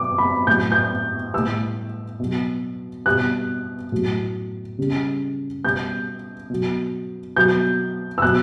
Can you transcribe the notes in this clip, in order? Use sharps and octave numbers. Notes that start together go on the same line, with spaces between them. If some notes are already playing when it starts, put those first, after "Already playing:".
Already playing: B2 F#3 D6
B5
A2 F#3 G6
G6
A2 G3 E6
B2 F#3
B2 G3 F#6
A2 F#3
C#3 G3
B2 G3 G6
B2 F#3
B2 F#3 G6
E6
B2 F#3 F#6